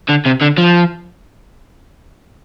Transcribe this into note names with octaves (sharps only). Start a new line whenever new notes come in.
D3
C3
D3
F3